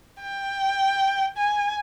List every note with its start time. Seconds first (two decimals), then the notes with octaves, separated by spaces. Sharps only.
0.21 G5
1.37 G#5